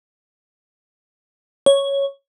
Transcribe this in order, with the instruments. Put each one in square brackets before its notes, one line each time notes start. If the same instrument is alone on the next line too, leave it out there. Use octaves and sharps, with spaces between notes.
[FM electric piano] C#5